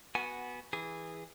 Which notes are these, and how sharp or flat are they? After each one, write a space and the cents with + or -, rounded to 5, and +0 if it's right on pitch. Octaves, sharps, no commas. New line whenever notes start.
B3 -10 F#4 +0 G#5 +0
E3 -10 G#4 -15